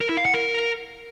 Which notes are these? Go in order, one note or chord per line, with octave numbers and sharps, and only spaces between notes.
A#4
E4
F5
F#5
A#4